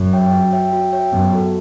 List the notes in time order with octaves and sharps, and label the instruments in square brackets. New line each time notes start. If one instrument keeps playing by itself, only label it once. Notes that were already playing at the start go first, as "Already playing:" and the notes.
Already playing: [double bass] F#2
[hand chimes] C#5 E5 G5
F#4
C#5 E5 G5
F#4
C#5 E5 G5
[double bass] F#2 [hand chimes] B3
[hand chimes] F#4 A4